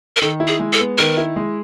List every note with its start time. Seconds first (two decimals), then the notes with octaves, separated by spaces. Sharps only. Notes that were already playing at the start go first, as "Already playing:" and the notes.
0.16 A#4
0.21 D#3 A4
0.40 E4
0.47 G#4
0.60 G#3
0.73 A4
0.80 B3
0.98 D#3 A#4
1.17 E4
1.36 G#3